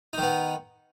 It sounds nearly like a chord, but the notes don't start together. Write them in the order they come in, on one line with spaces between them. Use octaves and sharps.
D#4 D#3 B3